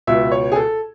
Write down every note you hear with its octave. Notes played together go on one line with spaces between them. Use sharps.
C#2 B2 E5
C#5
G#4
A4